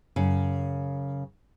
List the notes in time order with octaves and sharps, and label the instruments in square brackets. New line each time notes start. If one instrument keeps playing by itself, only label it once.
[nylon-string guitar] F#2 C#3